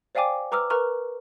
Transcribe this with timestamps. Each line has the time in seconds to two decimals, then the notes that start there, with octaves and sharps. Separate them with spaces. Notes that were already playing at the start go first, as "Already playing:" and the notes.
0.15 C5 D5 F5 G5 G#5 D6
0.52 B4 A#5 D6 E6 F6
0.70 A#4 B4 A#5 C#6 F6